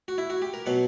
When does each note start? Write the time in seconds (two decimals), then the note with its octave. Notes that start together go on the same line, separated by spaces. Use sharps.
0.08 F#4
0.18 E4
0.30 F#4
0.42 G4
0.54 A#4
0.66 B2 F#3 F#5